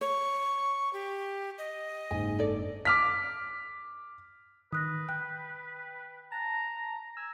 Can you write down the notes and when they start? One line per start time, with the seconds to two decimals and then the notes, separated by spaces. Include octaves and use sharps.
0.01 C#5 C#6
0.93 G4
1.58 D#5
2.11 F#1 G#2 G#5
2.38 D4 A4 D5
2.85 D6 F6 B6
4.73 D#3 B4 D#6 F#6 A#6
5.09 G5 F#6
6.32 A5 A#5
7.17 G#5 E6